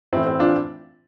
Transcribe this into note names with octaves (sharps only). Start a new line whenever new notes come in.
A2 E3 C4 E4
C4 E4
D4 F4